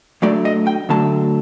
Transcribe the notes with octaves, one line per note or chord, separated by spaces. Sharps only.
D2 D3 F#3 A3 D5
D#5
G5
D2 D3 F#3 A3 A5